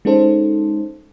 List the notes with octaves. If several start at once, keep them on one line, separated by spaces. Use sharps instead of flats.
G#3 C#4 D#4 A4 C5